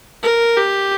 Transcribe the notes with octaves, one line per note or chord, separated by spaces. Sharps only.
A#4
G4